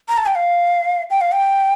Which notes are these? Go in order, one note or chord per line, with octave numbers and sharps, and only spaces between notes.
A#5
A5
G5
F5
G5
F5
G5